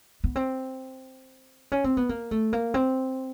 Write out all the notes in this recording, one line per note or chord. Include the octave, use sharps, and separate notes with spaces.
B3
C4
C#4
C4
B3
A#3
A3
A#3
C4